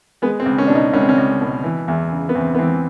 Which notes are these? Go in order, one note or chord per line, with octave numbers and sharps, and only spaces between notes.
G#3 B3
C4
C#2
C#4
B2 D4
D#4
C#2 C#4
C4
C#4
C#2
B2
E3
E2
C#3
B3
E2 C4
B3
E3 C4